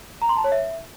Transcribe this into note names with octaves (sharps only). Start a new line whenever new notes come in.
A#5
C6
A5
C#5
E5